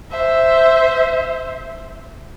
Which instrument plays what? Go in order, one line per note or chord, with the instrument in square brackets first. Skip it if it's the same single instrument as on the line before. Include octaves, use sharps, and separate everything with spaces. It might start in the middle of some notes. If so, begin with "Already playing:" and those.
[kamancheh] C5 E5